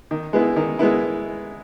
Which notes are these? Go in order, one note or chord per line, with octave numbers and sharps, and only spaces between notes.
D#3
G#3 B3 E4
D#3
G#3 B3 E4